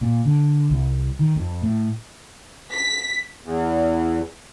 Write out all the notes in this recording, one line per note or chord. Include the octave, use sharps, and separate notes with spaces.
A#2
D3
C2
D#3
F2
A2
B6
E2